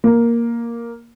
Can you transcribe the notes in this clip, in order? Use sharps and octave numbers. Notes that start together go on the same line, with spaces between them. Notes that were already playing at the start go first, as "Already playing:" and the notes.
A#3